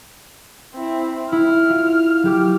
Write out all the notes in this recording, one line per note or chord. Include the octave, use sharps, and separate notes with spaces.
C4 E4
E4 F6
F4
F#3 G4 D6